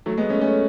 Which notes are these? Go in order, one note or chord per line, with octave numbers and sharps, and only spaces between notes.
F#3 A3
G#3 B3
A3 C#4
A3 C#4